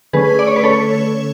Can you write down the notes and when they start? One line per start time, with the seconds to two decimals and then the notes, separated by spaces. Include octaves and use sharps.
0.13 D3 A3 C#4 G#4 B4
0.39 D5
0.47 C#5
0.56 B4
0.64 A4 C#5